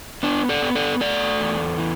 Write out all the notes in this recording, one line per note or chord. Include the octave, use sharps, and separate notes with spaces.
B3 D4
A4 D5
B3
A4 D5
A3 A4 D5
E2
E3